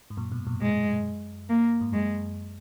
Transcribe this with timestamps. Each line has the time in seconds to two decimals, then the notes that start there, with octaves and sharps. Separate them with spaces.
0.10 G#2
0.17 F#2 A#2
0.32 G#2 B2
0.47 F#2 A#2
0.61 F#2 G#3
1.49 A#3
1.81 G#2
1.92 F#2 G#3